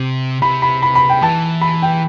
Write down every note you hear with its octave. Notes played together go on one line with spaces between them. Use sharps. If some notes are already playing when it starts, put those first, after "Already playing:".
Already playing: C3
C3 B5
B5
B5
B5
G5
E3 A5
B5
G5